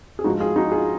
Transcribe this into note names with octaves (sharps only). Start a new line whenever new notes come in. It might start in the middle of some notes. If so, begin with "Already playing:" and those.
G#4
G#2 F3 D#4 F#4
F4 G#4
D#4 F#4
F4 G#4